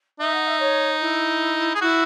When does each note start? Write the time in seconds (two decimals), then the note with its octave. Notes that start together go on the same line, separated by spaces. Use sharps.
0.19 D#4 E5
0.33 F#5
0.47 E5
0.59 C#5
1.01 E4
1.75 G#4
1.81 E4 F#4